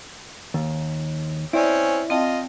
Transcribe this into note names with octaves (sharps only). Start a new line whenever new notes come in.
D#2
C4 C#4 E4 D5
C4 F4 D#5 G5 A5